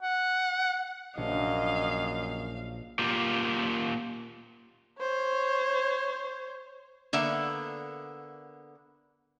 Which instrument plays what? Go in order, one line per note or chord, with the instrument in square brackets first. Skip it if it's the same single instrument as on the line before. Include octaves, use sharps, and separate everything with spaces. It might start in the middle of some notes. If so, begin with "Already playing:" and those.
[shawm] F#5
[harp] A#1 [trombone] F#2 [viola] D#5 [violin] F5
[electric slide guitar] A#3 F4 G4
[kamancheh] C5 C#5
[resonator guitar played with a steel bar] D3 A#3 B3 E5